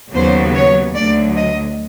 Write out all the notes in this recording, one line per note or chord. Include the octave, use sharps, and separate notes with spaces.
D#2 C#3 F#3 B3 C5
C#5
D2 D3 F#3 D5
D#5